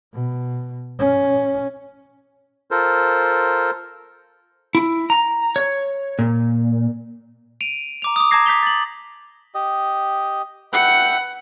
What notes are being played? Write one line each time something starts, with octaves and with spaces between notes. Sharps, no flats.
B2
C#4
F4 A4 A#4 C5
E4
A#5
C#5
A#2
D7 D#7 F7
A#5 D6 F7
D6 D#6
A5 A#5 D6 G#6 A#6 C7
D6 G6 B6 F7 G7
A6 F#7
G4 D#5
B4 E5 F#5 G5 C#7